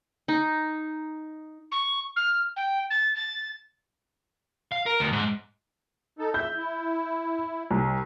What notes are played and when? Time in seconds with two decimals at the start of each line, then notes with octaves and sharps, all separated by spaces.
0.28 D#4
1.71 C#6
2.16 F6
2.56 G5
2.90 A6
3.15 A6
4.72 F5
4.86 A#4
5.00 D2
5.13 G#2
6.19 D#4 A4
6.34 E5 G6
6.57 E4
7.71 C2